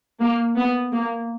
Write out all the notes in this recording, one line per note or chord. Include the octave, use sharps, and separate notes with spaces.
A#3
B3
A#3